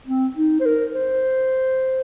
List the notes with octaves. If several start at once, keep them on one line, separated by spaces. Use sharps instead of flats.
C4
D#4
C5
A#4
C5